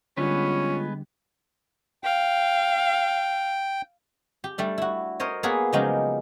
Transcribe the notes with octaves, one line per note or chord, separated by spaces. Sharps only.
D3 G3 G#3 B3 C#4 F4 B4
F5 G5
G4
G3 A3 D4
E4 F#4
A#4 C5 C#5 D#5
A#3 B3 G#4 A4 B4 C#5
C#3 F3 F#3 G#3 D#4 G4